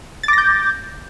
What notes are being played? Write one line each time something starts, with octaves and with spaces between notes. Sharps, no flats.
D6 G6 A6 A#6